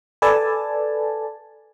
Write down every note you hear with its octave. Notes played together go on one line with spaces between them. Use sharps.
A4 B4 D5 G#5 A5